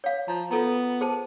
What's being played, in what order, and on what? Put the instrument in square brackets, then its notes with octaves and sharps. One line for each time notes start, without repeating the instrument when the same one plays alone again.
[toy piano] C#5 F5
[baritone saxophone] F3 [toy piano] A#5
[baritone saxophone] B3 [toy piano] F4 A4 A#5
[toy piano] G#4 C5 A5